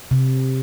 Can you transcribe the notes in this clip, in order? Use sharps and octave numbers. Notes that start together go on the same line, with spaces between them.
C3